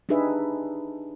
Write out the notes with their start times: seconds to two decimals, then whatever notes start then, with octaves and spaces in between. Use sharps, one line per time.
0.09 D4 D#4 G4 G#4 B4 E5